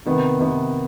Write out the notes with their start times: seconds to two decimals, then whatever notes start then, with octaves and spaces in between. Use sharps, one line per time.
0.06 C3 D#3 B3
0.39 C3 D#3 B3